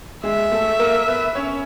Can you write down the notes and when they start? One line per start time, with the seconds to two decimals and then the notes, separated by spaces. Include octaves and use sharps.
0.24 G#3 G#4 E5
0.51 A3 A4
0.79 A#3 A#4
1.07 B3 B4
1.35 C#4 C#5